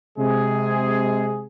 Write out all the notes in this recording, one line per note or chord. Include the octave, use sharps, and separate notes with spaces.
C3 G#3 G#4